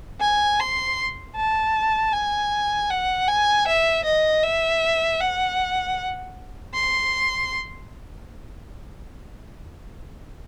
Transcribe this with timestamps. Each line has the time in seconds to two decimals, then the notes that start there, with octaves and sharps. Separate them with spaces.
0.21 G#5
0.60 C6
1.37 A5
2.13 G#5
2.91 F#5
3.28 G#5
3.68 E5
4.05 D#5
4.43 E5
5.21 F#5
6.74 C6